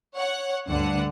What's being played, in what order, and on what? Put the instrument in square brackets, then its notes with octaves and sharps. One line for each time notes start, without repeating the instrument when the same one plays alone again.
[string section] C#5 F#5
D2 G2 D3 F#5